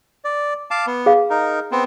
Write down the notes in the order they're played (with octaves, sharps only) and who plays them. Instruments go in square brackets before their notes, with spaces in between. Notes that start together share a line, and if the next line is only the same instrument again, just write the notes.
[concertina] D5
F5 A5 D6
B3
[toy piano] G#4 F5
[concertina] D#4 A#4
B3 C4